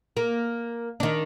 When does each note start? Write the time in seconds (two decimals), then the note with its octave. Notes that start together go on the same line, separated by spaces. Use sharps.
0.17 A#3
1.00 D#3 D4